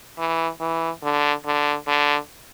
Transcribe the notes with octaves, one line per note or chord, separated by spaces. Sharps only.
E3
E3
D3
D3
D3